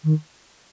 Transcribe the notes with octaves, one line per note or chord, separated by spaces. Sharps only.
D#3